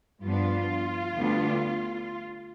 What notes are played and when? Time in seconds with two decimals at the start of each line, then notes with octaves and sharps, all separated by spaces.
0.24 G2 F3 B3 D4 F4
1.15 D2 D3 G3 B3 D4